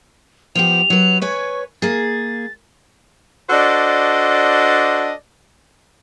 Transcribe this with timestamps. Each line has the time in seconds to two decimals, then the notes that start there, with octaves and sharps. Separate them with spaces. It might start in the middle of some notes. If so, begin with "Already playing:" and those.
0.55 F3 B3 G4 F7
0.90 F#3 B4
1.22 B4 C#5 G#5 C#6
1.82 A#3 G#4 A6
3.50 D4 F#4 A4 C5 D5 D#5